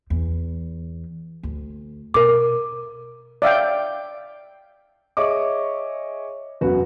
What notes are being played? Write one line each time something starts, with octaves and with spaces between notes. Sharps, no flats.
E2
D2
B2 A#4 D6
D5 E5 F5 G5
G#4 C#5 D#5 E5 C#6 D6
E1 F#2 F#4 B4